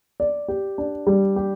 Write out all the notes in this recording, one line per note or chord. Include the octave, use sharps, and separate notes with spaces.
D5
G4
D4
G3
G4